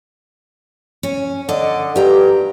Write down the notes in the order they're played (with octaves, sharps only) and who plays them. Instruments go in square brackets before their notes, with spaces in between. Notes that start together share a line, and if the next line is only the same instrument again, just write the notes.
[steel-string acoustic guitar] C#4
[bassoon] D3 [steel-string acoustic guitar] D5 D#5
[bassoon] G2 [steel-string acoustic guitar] G4 A#5